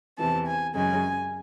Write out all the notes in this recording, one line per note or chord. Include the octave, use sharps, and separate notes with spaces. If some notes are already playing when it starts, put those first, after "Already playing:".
E2 C3 E3 A5
G#5
F#2 C#3 G#3 G#5